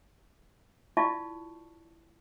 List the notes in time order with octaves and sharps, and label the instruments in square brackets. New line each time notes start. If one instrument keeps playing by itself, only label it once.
[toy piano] E4 F4 D5 A5 C#6